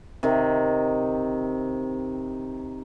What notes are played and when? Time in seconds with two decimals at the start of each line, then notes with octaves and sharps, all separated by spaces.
0.23 C3 D#3